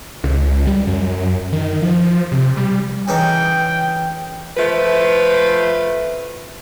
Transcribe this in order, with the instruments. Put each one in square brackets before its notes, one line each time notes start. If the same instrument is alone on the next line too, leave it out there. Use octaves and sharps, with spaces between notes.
[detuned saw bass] C#2
G3
F#2
D#3
F3
C3
G3
[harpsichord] C#3 E3 D#4 [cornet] G5
[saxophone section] F3 A3 B4